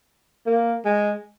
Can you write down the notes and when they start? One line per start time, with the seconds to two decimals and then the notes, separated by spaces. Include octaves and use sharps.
0.46 A#3
0.85 G#3